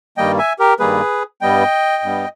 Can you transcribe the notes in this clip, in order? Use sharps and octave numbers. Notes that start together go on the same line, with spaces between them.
G2 D#3 G3 A#3 D#5 G5
E5 G#5
G4 A#4
G2 D#3 G3 A#3 G#4 B4
G2 G3 B3 D#5 G5
G2 G3 B3